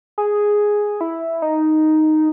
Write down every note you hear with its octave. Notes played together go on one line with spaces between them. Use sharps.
G#4
E4
D#4